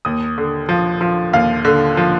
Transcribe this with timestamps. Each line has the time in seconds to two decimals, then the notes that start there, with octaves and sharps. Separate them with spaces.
0.05 D#2 D#6
0.38 D3
0.69 F3
1.01 F3
1.33 D#2 F5
1.65 D3
1.97 F3